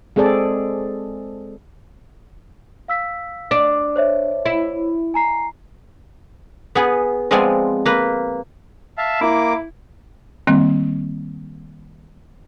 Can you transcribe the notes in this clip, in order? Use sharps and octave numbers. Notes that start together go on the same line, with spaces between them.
G#3 C4 G#4 A4 D5
F5 E6 B6
D4
C5 C#5 E5
E4
G#5 A#5 C7
B3 G#4 B4
F3 G#3 B3 C4 D5 G#5
A#3 B4
E5 F5 A5
A#3 E4 D6
D#3 G3 A#3 C4